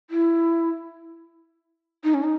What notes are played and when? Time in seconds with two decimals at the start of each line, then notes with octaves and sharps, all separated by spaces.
0.10 E4
2.04 D#4
2.14 C#4
2.24 D#4